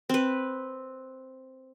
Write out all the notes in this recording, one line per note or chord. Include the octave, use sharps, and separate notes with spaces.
C4 B4